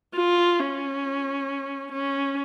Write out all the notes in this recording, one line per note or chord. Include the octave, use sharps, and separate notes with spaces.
F4
C#4
C#4